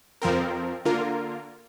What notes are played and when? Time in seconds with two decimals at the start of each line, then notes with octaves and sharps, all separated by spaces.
0.22 F2 F3 C4 A#4
0.85 D3 A#3 F4 A#4